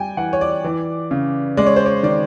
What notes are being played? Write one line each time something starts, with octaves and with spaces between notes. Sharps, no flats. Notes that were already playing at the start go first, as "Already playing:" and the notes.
Already playing: G3 G5 G#5
E3 F#5
C#5
D5
E3
C#3
G#3 D5
C#5
C5
C#5
D#3 D5